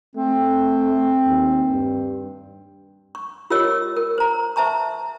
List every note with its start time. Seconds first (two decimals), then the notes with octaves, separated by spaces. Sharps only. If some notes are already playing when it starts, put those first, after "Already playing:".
0.16 A3 C4
1.27 D#2
1.71 G2
3.15 C#6
3.50 F4 G4 A#4 C#5 D#5 E6
3.96 A#4
4.18 C5 A#5
4.56 C5 E5 A5 A#5 C#6